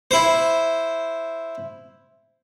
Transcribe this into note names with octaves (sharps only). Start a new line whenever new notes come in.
E4 C5